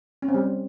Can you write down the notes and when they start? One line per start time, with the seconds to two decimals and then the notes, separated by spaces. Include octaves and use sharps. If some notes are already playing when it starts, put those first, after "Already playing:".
0.22 C#4
0.28 C4
0.34 G3